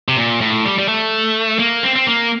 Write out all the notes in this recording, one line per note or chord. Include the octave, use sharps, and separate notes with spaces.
C3
A#2
A2
G3
G3
A3
A#3
C4
C4
A#3